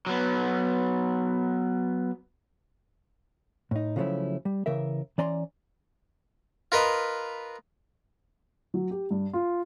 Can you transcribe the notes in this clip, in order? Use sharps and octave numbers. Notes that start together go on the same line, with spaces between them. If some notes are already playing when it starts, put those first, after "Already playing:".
F#3 B3
A2 D#4
C#3 F3 F#3 A3 C#4 E4
G3
C#3 E3 A#4 E5
E3 C#4 D5 G#5 A#5 C6
F4 A#4 B4 D#5
F#3
G4
G2
F4